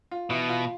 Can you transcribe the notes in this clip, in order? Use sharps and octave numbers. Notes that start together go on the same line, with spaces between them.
F4
B2 E3
F4